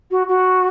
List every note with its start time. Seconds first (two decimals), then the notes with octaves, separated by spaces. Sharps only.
0.11 F#4
0.28 F#4